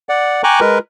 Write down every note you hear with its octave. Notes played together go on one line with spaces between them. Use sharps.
D5 F#5
G5 G#5 A#5 C#6 D6 F#6
G#3 A#4 B4